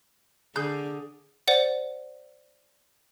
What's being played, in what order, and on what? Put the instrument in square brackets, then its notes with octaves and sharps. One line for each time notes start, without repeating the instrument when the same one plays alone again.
[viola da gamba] D3 [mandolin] G#4 G6
[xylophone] C5 D5 F#5